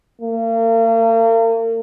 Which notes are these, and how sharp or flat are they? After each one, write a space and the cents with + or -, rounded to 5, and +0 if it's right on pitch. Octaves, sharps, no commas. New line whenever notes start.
A#3 -40